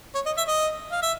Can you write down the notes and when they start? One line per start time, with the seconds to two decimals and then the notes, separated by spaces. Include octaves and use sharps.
0.15 C#5
0.26 D#5
0.37 E5
0.48 D#5
0.92 F5
1.02 E5